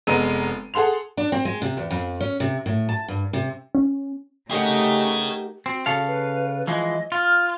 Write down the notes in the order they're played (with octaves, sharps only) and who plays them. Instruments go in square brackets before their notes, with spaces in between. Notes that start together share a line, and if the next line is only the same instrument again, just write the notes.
[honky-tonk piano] F1 G#3 B3 A#5 E6 D#7
G#4 A4 F#5 C6 F7
[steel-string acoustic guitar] D4
C4
G#3
C3
E2
F2
C#4
C3
A2
A5
G2
C3
[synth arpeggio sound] C#4
[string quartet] A3 D#4 [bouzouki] G4 A#4 F#5 [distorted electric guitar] G#4 C#5
[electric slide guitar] C4 [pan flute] F#4
[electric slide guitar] C#3 A4 F5
[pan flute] B4
[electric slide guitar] E3 F3 G#3 [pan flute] D#5
[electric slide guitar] F4 [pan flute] F6